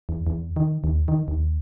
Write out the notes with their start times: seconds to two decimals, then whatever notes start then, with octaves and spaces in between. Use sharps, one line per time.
0.09 E2
0.27 E2
0.56 D#3
0.84 D#2
1.08 D#3
1.28 D#2